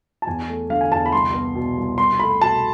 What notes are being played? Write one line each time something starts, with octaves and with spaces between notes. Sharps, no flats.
A5
E2 G#5
A3
D3 F5
G#5
E2 A5
B5
C2 C6
B3
B2
C2
C2 C6
A3 B5
B2 A5